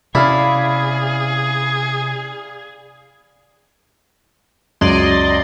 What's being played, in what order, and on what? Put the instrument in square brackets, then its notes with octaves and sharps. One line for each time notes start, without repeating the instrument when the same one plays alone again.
[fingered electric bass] C3 C#4 [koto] E4 [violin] G#4 [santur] D5 F5 B5
[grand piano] C#2 F#2 G#6 [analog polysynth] D5 D#5 C6